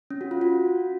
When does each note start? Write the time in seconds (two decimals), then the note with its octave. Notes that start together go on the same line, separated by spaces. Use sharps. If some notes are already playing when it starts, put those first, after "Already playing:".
0.11 C#4
0.21 F#4
0.31 F4
0.41 F#4